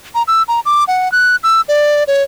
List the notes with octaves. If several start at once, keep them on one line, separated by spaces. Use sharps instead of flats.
A#5
E6
A#5
D6
F#5
F#6
E6
D5
C#5